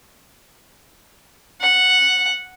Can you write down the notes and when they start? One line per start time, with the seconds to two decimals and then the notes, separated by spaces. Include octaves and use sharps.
1.61 F#5